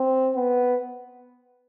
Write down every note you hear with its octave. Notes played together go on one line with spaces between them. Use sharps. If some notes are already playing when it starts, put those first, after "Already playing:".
Already playing: C4
B3